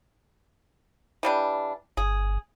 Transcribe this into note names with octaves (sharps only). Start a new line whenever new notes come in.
E3 G3 D4
G1 G#4